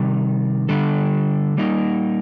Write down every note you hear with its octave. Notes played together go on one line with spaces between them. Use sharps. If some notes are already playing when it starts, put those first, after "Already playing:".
Already playing: C3 D#3 G3
D3 G3 D4 A4
G3 A#3 D#4